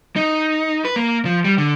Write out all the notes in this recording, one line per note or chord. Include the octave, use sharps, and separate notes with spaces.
D#4
B4
A#3
F3
G3
D3